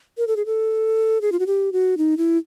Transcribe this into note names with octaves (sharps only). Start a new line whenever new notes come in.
A#4
A4
G#4
A4
G#4
F4
F#4
G4
F#4
D#4
E4